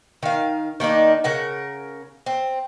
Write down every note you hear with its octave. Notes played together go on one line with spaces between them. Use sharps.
D#3 F5
D#3 A#3 D4 D#4
C#3 A#4 F#5
C4